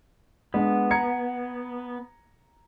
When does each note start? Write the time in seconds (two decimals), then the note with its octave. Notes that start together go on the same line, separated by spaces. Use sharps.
0.54 G#3 B3 D4
0.91 A#5 G#6 C#7